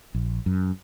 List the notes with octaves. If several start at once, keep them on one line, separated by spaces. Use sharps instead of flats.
A#1
F#2